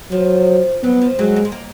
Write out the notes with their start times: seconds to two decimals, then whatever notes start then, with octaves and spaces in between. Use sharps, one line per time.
0.12 F3 F#3
0.83 F#3 B3
1.02 F3
1.19 F#3 G#3
1.36 A#3
1.45 G#3
1.52 A#3